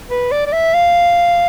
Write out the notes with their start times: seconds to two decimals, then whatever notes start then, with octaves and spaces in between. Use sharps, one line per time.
0.10 B4
0.31 D5
0.47 D5
0.53 E5
0.74 F5